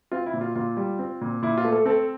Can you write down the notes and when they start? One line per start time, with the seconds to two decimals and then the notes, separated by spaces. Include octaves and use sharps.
0.12 C4 F4
0.26 E4
0.33 A#2
0.41 F4
0.55 A#2 F4
0.77 G3
0.99 C4
1.21 A#2
1.42 A#2 E4
1.58 F4
1.65 A3
1.72 A4
1.86 C4 A4